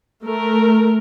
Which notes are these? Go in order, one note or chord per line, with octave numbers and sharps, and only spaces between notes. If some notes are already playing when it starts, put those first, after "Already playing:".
A3 A#4